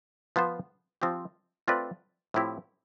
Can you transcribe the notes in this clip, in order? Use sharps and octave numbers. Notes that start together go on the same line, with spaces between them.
F3 B3 F4 C5
F3 C4 G4
A3 C4 F4 B4 D5
A2 F3 C4 E4 G4